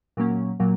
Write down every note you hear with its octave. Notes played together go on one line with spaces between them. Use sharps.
A#2 F#3 A#3 C#4
A#2 F#3 A#3